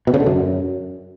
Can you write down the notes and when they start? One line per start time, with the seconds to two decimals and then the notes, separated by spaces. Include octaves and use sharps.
0.07 B2
0.14 C#3
0.20 D3
0.26 F#2